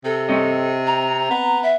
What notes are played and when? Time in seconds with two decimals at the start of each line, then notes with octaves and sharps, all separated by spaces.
0.05 C3 A4
0.29 C4 C#5 D#5
0.87 A#5
1.30 B3
1.63 E5